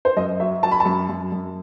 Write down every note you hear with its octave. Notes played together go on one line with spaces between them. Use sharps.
C5
F#2 D#5
F#3 E5
F#3 A5
B5
A5
F#2
F#2
F#2